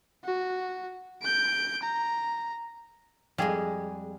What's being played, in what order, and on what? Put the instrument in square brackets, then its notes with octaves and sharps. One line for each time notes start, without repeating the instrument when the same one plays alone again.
[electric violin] F#4
G6 D7
A#5
[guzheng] F2 G#3 [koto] G3 G#4